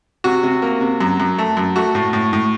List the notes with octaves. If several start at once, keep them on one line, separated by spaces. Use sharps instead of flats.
C3 F#4
C3
A#3
C3
F#2
F#2
A3
F#2
A3 F#4
A2
A2
A2